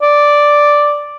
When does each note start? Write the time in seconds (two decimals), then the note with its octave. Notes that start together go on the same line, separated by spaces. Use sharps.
0.02 D5